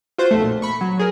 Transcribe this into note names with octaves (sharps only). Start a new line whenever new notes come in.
F4 F#4 C5
B1 F2 A3
A#2
B5 C#6
F#3
F#3 G#4 A#4